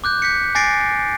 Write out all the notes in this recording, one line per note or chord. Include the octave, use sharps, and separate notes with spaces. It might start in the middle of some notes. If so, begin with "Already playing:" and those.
D6 F#6 G6
G6 B6 C#7
G#5 D6 A6 A#6 C7 D7